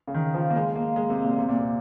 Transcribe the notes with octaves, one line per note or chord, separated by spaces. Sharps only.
C#3
D#3
F3
A#3
G#3
A#3
G#3
C3
A#2
C3
A#2
C3